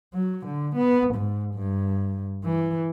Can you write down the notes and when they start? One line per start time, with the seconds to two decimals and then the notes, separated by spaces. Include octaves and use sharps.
0.14 F#3
0.47 D3
0.76 B3
1.15 G#2
1.55 G2
2.44 E3